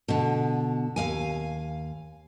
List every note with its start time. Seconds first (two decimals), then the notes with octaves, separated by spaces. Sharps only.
0.08 B2 D3
0.96 D#2 F5 G#5